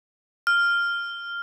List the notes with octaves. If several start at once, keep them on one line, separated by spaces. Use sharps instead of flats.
F6